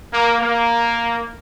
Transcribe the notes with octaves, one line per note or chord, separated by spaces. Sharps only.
A#3
A#3